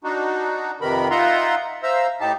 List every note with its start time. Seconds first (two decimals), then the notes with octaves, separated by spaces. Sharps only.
0.04 D4 D#4 F#4
0.81 F2 C3 D#3 B3 A#4 B5
1.10 D#4 F4 E5 F#5 A#5 C6
1.83 C5 E5 F5 A#5 E6
2.20 A2 D#4 G4 A5